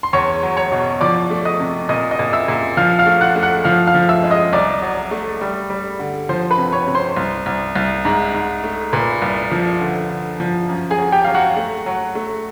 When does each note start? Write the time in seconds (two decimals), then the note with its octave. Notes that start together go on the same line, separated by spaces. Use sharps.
0.03 C6
0.13 E2 C#5 C#6
0.43 F#3
0.57 C#5 C#6
0.72 B2
1.01 F3 D5 D6
1.31 A3
1.45 D#5 D#6
1.60 C3
1.89 A#2 D#5 D#6
2.11 D#5 D#6
2.19 A#2
2.33 E5 E6
2.48 A#2
2.77 F3 F5 F6
2.99 F5 F6
3.06 A3
3.21 F#5 F#6
3.36 A3
3.43 F#5 F#6
3.65 F3 F5 F6
3.87 F5 F6
3.94 F3
4.09 E5 E6
4.24 G#3
4.31 D#5 D#6
4.53 C2 D5 D6
4.82 F#3
5.11 A3
5.41 G3
5.70 G3
5.99 D3
6.29 F3 C5 C6
6.51 B4 B5
6.58 C3
6.73 C#5 C#6
6.87 C3
6.95 C5 C6
7.17 C2
7.46 C2
7.76 C2
8.05 G#2
8.34 G#2
8.64 A3
8.93 A#2 B4 B5
9.22 C2
9.51 F3
9.81 D3
10.10 D3
10.40 F3
10.69 F#2
10.90 G#4 G#5
10.98 F#3
11.12 G4 G5
11.24 F#3 F5
11.35 F#4 F#5
11.57 A3
11.86 F#3
12.15 A3